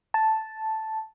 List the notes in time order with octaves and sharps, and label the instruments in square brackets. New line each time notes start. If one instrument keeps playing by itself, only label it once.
[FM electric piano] A5